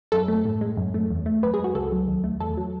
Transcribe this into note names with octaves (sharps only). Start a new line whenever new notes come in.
F#2 A4
A3
A2
G#3
F#2
A3
E2
A3
F#2 B4
G#4
G#3 F#4
C#2 A4
F#3
D#2
A3
E2 A4
F#3